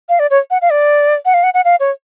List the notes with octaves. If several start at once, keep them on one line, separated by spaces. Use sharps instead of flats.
F5
D5
C#5
F#5
F5
D5
F#5
F5
F#5
F#5
F5
C#5